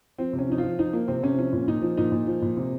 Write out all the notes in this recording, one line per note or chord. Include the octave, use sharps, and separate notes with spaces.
F3 C4
C3
C#4
F3 D#4
F4
F3
F3 D#4
F3 A#3
C3 C4
C3 C#4
F3 C#4
A#2
A#2 D#4
F3
A#2 D#4
A#2
F3
A#2
C3